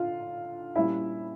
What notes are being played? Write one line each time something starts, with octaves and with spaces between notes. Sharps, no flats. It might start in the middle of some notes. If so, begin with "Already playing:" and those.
Already playing: D3 F4 F5
A#2 G3 A#3 C#4 E4 E5